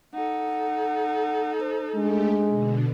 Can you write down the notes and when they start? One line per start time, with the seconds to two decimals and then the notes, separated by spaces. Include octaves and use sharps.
0.14 D#4 A4 F#5
1.61 C5
1.96 G#3 A3 D4 G4
2.47 B2 D3